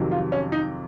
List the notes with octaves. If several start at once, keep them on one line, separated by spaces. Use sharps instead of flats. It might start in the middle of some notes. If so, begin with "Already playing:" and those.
Already playing: F2 C3 D#3 F#3
F4
C#4
D#4